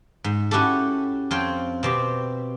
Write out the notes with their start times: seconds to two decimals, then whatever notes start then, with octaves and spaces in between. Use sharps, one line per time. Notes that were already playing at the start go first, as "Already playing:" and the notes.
0.24 G#2
0.51 C#4 E4 F#4 G4 A4
1.31 F2 C4 F4 C#5 G5
1.83 B2 C4 G4